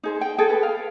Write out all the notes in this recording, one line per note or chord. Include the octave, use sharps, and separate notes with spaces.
D#4 G#4 C5
G5
G#4 A4 G5
B4
F5